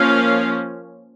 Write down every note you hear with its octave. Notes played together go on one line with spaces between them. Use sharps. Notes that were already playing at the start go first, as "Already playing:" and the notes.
Already playing: F3 A#3 C#4 F5